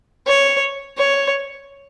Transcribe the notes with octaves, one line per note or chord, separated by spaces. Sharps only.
C#5
C#5